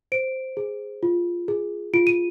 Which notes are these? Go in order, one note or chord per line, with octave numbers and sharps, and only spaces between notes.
C5 D7
G#4
F4
G#4
F4 D7
D#7